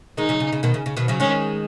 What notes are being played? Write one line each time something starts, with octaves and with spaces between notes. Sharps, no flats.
D#3 G#3 D#4
C#3 F#3
C#3
C#3
B2 D#3
C#3
C#3
B2 D#3
C#3 F#3
D#3 G#3 C#4